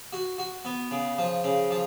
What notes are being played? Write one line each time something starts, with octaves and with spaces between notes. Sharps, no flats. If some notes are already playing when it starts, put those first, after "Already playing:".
F#4
F#4
B3
C#3
F3
C#3
F3